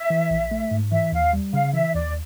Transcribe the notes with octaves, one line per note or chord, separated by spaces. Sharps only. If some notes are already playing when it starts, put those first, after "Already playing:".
Already playing: E5
E3
A#1
A3
G#2
E3 E5
D#2 F5
G3
C#3 F5
E3 E5
D#2 D5